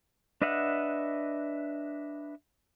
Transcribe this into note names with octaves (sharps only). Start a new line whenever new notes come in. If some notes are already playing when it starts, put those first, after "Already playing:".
D4 B4 D#5 E5 F#5